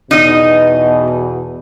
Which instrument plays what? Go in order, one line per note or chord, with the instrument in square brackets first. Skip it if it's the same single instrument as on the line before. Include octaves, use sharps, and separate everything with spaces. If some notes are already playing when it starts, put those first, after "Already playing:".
[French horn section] E2 B2 [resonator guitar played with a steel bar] D#4 D#5